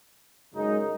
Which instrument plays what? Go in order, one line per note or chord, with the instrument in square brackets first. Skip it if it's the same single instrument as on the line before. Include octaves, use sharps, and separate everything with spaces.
[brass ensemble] F#2 C#3 G#3 D#4